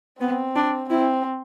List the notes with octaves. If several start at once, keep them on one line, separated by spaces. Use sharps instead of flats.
B3 C4
D4
C4 E4